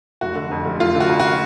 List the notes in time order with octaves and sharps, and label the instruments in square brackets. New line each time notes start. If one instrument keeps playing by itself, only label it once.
[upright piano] F1 F#4
D3
F2
F1
F1 F4
D3
F#4
F2
F#4